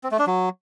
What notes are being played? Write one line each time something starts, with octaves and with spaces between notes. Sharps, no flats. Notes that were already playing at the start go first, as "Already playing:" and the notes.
C4
A3
D4
F#3